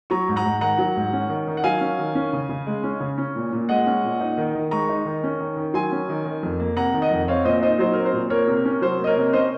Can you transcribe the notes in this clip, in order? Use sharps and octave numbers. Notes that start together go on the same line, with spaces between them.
F#3 A#5 C#6
G#2
F#5 A#5
G#2
D#3 F#5 A#5
F#3
G#2
C#4
D#3
D#3
F#5
F#3 F5 G#5
C#4
D#3
C#4
C#3
C#3
G#3
C#4
C#3
C#4
A#2
A#2
G#3 D#5 F#5
C#4
A#2
D#4
D#3
D#3
G#3 A#5 C#6
D#4
D#3
C#4
D#3
D#3
F#3 G#5 C6
C#4
D#3
D#3
F2
A#3
C3 F#5 A#5
D#3
D#5 F#5
F2
C4 C#5 F5
A#2 C5 D#5
D#4 C5 D#5
F#3 C5
C4 A#4
C5
A#2
A#3 A#4 C#5
C3
A#4
C#4
F#3 C5
A#3 D#5
A#4 C#5
C3
C#4 C5 D#5